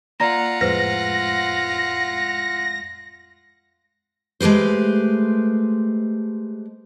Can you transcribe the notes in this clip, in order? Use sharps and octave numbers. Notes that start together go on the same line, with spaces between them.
A#3 F4 D5 F#5 A#5 A#6
F2 A2 G#3 B4 C5 A#6
G#3 A3 G4 B4 C5